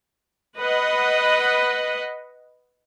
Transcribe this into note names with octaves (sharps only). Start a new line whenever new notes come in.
B4 D#5 F#5